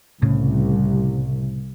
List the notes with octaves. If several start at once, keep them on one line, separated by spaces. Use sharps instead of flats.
C2 A2 C#3